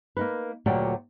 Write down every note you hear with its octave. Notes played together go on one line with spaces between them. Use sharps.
A#3 D#4 B4
D2 A#2 F#3 G4 D5